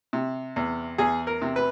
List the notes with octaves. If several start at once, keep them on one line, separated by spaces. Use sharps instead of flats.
C3
E2
E2 G#4
A#4
C3
B4